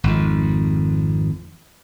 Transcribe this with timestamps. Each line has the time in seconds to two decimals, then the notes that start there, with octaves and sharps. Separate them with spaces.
0.04 G#1 F2